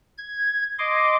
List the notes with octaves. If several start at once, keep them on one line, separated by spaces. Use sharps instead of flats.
G#6
D#5 C6 D6